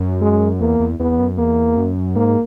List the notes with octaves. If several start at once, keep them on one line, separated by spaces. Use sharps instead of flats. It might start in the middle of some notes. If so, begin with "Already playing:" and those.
Already playing: F#2
G#3
E2 A#3
E2
E2 B3
F#2
E2 A#3
F#2
G#2 A#3